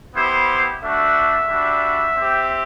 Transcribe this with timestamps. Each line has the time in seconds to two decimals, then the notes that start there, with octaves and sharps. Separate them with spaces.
0.14 B3 E4 G4 C5
0.82 A3 D4 F#4 E5
1.49 G3 D4 F#4
2.17 C4 G4